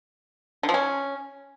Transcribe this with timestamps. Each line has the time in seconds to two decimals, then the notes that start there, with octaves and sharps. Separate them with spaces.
0.63 D3
0.69 F3
0.74 C#4